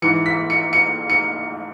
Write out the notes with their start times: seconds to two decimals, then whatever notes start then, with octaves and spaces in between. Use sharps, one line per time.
0.02 G#2 E3 C#7
0.26 B6
0.50 C#7
0.73 C#7
1.10 C#7